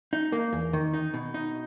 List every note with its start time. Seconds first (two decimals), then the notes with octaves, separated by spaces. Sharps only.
0.13 D#4
0.32 A#3
0.53 E2
0.73 D#3
0.94 D#4
1.14 B2
1.34 D#4